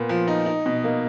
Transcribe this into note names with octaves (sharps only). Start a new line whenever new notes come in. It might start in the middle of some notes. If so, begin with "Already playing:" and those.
Already playing: A#2 B3
F3
D#4
D#4
B2
A#3